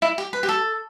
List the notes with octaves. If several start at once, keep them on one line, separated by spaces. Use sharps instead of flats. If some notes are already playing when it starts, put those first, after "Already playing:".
E4
G4
B4
G4
A4